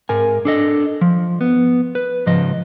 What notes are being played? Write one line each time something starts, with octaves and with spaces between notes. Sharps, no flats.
G#2 A#4 G#5
D4 A4 D#5
F3
B3
B4
C#2 G#2 F3 D#5